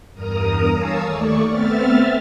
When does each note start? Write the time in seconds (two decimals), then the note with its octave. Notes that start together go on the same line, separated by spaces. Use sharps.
0.14 E2 G2 A#4 A#5 D#6
0.74 C#5 F5 G#5 A5 D#6 E6
1.03 D#2 A3 D5 C#6
1.47 A3 B3 C4 E5 F6 A6